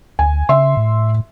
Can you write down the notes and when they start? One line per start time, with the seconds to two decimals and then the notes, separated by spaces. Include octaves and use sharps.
0.19 D2 G#5
0.49 C#3 E5 C6
0.77 A2